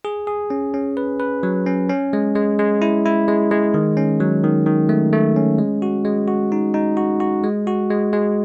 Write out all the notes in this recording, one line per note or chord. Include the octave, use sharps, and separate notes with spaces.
G#4
G#4
C#4
C#4
B4
B4
F#3
C#4
C#4
G#3
G#3
G#3
E4
E4
G#3
G#3
D#3
C#4
F#3
D#3
D#3
A3
A3
C#4
G#3
F#4
G#3
F#4
D#4
D#4
F#4
F#4
G#3
F#4
G#3
G#3